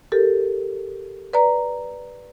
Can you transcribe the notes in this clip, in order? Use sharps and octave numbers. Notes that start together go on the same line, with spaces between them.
G4 A4 A#4
B4 D5 A#5